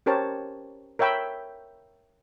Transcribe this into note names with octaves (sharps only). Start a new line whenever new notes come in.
C#4 G4 A#4 C5 C#5 A5
A#4 C#5 E5 G5 B5 E6